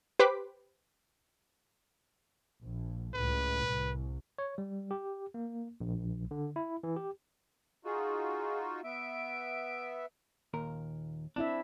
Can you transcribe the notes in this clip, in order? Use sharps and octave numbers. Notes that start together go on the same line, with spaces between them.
G4 B4 C5 D6 B6
A#1
C#2 A2 B4
C2
C#5
G3
G4
A#3
A#1
D3
E4
E3
G4
D#4 F4 F#4 G#4
B3 E5 D7
D#2 A#2 A#4
C4 D4 E4 E5